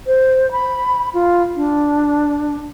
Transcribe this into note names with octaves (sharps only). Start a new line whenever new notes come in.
C5
B5
F4
D4